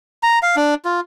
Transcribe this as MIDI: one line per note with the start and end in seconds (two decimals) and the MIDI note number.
0.23 0.39 82
0.43 0.56 77
0.56 0.74 62
0.85 1.00 65